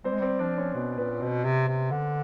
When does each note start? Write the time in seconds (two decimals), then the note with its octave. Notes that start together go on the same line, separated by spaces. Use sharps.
0.04 G3 C4 C5
0.13 G#3
0.20 G3 C4 C5
0.39 F3 D4 D5
0.58 C#4 C#5
0.74 B2 B3 B4
0.97 A#2 B3 B4
1.21 B2 C4 C5
1.45 C3
1.68 C3
1.91 D3